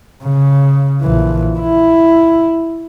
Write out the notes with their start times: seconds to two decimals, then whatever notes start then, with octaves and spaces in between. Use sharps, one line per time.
0.23 C#3
1.01 A#1 E3
1.59 E4